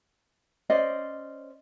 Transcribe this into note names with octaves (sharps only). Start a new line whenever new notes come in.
C#4 C5 D5 D#5